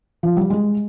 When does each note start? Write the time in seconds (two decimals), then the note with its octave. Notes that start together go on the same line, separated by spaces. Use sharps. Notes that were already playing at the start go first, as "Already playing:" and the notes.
0.23 F3
0.37 G3
0.50 G#3